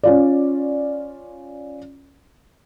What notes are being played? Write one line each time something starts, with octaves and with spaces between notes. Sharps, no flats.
C#4 F4 D5